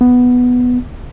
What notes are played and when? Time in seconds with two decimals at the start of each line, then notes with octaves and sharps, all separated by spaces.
0.01 B3